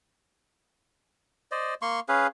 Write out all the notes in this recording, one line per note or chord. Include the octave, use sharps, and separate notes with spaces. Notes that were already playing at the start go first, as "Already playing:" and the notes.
C5 D5 D#5
A#3 C6 C#6
C#4 G#4 B4 F5